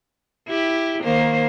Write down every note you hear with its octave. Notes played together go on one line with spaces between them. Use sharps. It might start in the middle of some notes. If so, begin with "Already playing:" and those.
E4 G4
D#3 A#3 C5